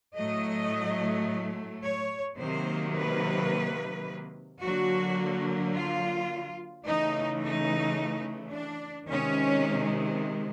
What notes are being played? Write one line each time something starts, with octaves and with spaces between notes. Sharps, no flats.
A2 F#3 A3 D#5
C#5
C3 D#3 F#3 A#3 C5
B4
D3 F#3 A#3 F#4
F4
C#3 E3 A3 D#4
D#4
D4
C3 D#3 G#3 C#4